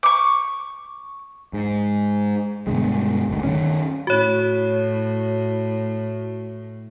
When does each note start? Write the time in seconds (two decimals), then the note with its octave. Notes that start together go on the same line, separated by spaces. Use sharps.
0.03 C#6 D6
1.53 G#2
2.67 G2 B2 D3 G#3
3.29 F#1 D2
3.43 D#3 C#4
4.07 A2 F#4 C#5